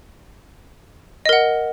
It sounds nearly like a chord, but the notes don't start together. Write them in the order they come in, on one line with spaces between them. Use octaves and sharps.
D#5 A#4 F#5